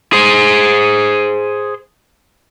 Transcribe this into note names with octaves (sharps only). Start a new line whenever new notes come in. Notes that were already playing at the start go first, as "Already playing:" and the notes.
G#4 C5